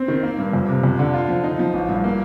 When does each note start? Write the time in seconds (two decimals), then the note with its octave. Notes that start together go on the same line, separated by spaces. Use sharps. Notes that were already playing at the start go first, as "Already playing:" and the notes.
Already playing: C4
0.08 D#3
0.23 A#3
0.38 G2
0.53 F2
0.68 C3
0.83 F2
0.99 D3
1.14 F4
1.29 F3
1.44 D#4
1.59 F3
1.74 A1
1.89 G2
2.04 A#3